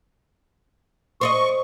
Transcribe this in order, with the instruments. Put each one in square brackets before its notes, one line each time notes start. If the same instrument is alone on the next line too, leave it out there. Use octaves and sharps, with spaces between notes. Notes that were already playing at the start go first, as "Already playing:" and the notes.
[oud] C5 D5 D#5 [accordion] C#6